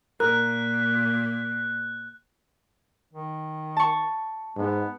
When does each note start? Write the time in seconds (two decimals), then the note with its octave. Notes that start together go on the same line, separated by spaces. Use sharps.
0.20 A#2 A#4 F#6
3.13 D#3
3.76 A5 C#6
4.57 G#2 B3